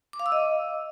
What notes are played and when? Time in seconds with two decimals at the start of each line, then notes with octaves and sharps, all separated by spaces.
0.13 D6
0.20 F5
0.26 E6
0.32 D#5